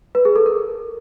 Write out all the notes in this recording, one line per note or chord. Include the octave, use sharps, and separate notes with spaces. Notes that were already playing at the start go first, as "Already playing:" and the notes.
B4
G#4
A4
A#4